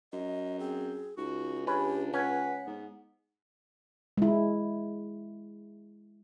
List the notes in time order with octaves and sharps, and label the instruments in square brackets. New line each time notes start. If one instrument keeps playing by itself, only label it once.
[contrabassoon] F#2 [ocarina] D#5
[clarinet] C4 [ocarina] G#4
[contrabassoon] C#2 [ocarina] D#4 [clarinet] F#4
[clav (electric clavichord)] C#4 B4 [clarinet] D4 [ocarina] G4
[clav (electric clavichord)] C#4 [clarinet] B4 [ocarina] F#5
[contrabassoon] G#2 [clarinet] B3
[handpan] G#3 E4